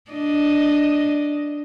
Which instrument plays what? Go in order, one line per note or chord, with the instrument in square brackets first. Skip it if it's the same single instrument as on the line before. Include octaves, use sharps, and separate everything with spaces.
[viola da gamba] D4 D#5